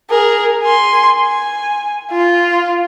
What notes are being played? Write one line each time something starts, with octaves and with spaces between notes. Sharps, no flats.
G#4 A#4
G#5 C6
G#5
F4